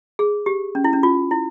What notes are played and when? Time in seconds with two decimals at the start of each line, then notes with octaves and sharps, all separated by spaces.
0.19 G#4
0.46 G4
0.75 C#4
0.84 E4
0.93 C#4
1.03 F4
1.31 E4